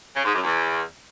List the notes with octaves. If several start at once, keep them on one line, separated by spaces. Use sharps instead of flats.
C#3
G#2
F#2
E2